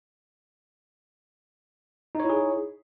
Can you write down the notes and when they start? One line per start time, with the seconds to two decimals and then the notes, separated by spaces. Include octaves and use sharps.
2.15 D#4
2.20 C#5
2.25 E4
2.29 G#4